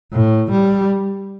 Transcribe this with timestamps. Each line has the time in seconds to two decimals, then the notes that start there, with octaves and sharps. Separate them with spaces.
0.13 A2
0.51 G3